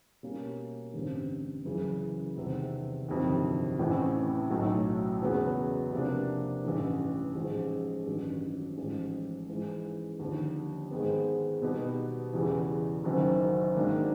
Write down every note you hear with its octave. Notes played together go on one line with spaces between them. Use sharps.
B2 G3 A#3 C#4
A1 G2 D3 G3 C4
F#1 F#2 C#3 E3
E2 C3 D#3 G3 C4
G1 F2 C3 D#3 F#3
A1 A2 E3 A3 C4
B1 A2 F#3 A3
E2 C#3 F#3 B3
C3 F3 A#3 D4
A1 G2 E3
A1 G#2 F3 G#3
A1 G2 D#3 F#3
A1 G#2 F3
G#2 E3 G#3
D#2 D3 F3
G#2 D#3 G#3 B3
B2 G3 B3 D#4 G4
E2 C#3 E3 G3
F#1 F#2 D#3
G#2 D#3 F#3 A#3 D4